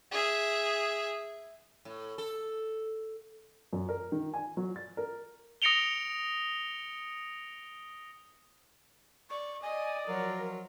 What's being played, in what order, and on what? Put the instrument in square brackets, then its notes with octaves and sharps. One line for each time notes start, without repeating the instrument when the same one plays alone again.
[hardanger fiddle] G#4 E5
[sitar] A2
A4
[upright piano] F#2
A#4
D#3
G#5
F#3
A6
A#4
[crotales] D#6 A#6 C#7 D7 F7 G7
[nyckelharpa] D5 [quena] C#6
[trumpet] D5 [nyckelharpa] D#5 D#6 [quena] G#5
[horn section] F3 F#3 [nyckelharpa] F4 [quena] A#4